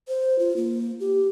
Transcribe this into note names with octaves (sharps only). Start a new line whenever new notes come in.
C5
F4
A#3
G4